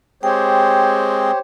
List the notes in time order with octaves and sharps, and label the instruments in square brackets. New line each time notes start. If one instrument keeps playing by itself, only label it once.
[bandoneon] G#3 C4 G#4 [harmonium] G4 C5 C#5 [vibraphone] G5